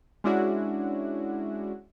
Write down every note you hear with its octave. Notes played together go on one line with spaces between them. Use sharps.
G#3 C#4 D4 E4 F#4